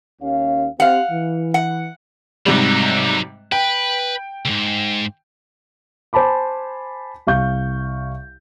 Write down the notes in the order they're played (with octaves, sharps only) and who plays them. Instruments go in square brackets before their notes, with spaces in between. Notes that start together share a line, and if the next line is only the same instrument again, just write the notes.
[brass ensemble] D#2 C#4 F5
[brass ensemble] C4 G4 [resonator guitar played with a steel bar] F5 F#5
[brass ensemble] E3
[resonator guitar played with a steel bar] F#5
[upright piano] G#2 C3 G3 [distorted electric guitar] F#3 D#4
[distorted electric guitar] B4 [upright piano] G5
[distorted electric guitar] C#2 G#2
[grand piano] C5 G#5 A5 B5 D6
C2 F5 C#6 G6